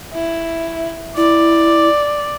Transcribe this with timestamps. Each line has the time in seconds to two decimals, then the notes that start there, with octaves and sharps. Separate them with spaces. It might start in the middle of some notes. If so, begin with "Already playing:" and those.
0.14 E4
1.17 E4 D5